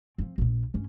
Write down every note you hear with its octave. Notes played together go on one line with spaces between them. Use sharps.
F3 C4
A#1 A#2
G2 C#4